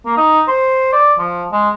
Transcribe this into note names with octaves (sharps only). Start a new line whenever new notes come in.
A#3
D#4
C5
D5
F3
G#3